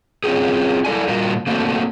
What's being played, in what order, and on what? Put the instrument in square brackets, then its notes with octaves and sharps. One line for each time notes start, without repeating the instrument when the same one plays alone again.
[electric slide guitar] C4 C#4 F4 G4 G#4
E4 A4 D5 G#5
A#2 G3 F4 F#4 A#4
A3 A#3 C4 F#4 G#4 A4